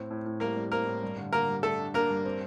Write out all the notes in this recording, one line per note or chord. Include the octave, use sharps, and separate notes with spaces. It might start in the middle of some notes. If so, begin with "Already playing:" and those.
Already playing: A2 C4
A2
A2
G3 A#3 A#4
G3
A#3 C4 A#4
A2
G2
D3
D3 A#3 A#4
G3
G3 A3 A4
D4
A#3 D4 A#4
G2
C4